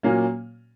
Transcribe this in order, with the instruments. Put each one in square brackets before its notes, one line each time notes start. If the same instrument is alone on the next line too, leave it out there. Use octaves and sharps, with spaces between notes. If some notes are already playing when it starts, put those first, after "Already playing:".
[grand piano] A#2 F#3 A#3 C#4